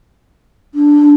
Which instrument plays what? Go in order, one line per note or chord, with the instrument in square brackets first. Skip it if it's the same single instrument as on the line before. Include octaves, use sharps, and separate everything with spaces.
[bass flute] D4